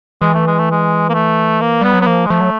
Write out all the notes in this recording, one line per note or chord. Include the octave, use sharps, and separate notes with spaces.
E3 G#3
A3
G#3
A3
G#3
A#3
A3
A#3
G3 B3
F#3
B3
F3 A#3
G#3
F3 A3
F#3